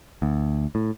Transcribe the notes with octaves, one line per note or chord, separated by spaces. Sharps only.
D2
A2